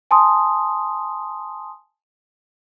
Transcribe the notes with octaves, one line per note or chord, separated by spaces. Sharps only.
G#5 A5 C6 D#6